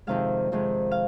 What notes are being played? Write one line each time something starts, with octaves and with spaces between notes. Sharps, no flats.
F2 C3 D#3 G#3 F5
F2 C3 D#3 G#3
F5